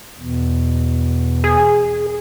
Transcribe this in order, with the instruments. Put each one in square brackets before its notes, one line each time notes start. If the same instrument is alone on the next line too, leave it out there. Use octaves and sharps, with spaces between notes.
[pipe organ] E2 B2
[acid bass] G#4